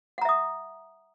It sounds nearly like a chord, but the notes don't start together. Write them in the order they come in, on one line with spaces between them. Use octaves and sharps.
F#5 A#5 E5 D#6